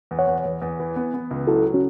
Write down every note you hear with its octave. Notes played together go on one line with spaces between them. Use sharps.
E2
C#5 F#5
E2
E2
E2
E3
B3
B3
C#2
F#3 E4 A4
C#4 F#4